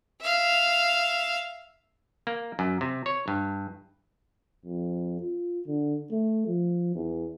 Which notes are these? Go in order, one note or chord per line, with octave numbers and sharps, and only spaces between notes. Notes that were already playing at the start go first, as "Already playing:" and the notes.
E5 F5
A#3
F#2
C3
C#5
G2
F2
F4
D3
A3
F3
E2